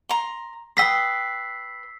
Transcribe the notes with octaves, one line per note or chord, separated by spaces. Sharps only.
A#5 C6
B4 G5 D#6 E6 B6 C7